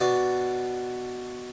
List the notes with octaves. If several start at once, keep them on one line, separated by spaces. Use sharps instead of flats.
B2 D4